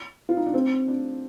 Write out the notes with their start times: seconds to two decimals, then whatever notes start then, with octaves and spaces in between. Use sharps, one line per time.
0.29 F4
0.37 D#4
0.46 D4
0.54 C4
0.88 D4